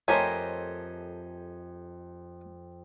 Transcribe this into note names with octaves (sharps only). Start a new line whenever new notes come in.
F2 A3 G4 A#4 C5 C#5 D#5 G#5